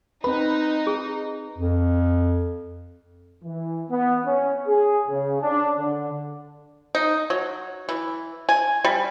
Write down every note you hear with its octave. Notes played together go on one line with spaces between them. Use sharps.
C4 D#4 B4 B5
G#4
F2
E3
B3
C#4
G#4
C#3
D4
D3
D#4
F#3
E3
G#5
G3